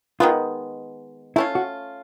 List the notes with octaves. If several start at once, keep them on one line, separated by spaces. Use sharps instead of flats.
D#3 G#3 B3 F4
A3 C#4 E4 F4
F#4